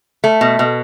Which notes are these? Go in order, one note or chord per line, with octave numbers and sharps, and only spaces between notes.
A3
B2
B2